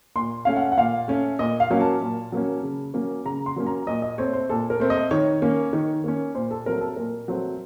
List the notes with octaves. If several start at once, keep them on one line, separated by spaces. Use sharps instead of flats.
A#2 C6
A3 C#4 F5
F#5
F#5
A#2 F5
A3 C#4
A#2 D#5
F5
F#3 A#3 C#4
A5
A#2
F#3 A#3 C#4
C#3
F#3 A#3 C#4
C#3 A#5
C6
F#3 A#3 C#4
A#5
A#2 D#5
D#5
A3 C4 C#5
C5
A#2 A4
A#4
A3 C4
D#5
D#3 C#5
A#3 C#4
D#3
A#3 C#4
A#2 C5
A4
F#3 A3 C4 A#4
A4
A#2 A#4
F#3 A3 C4